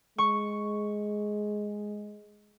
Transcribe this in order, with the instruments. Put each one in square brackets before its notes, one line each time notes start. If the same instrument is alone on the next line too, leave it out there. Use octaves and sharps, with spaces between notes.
[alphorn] G#3 [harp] C#6